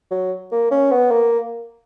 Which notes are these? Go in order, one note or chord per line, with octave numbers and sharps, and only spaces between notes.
F#3
A#3
C#4
B3
A#3